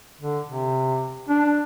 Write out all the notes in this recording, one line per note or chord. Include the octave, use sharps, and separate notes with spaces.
D3
C3
D4